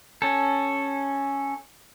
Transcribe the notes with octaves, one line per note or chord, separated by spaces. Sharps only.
C#4 A4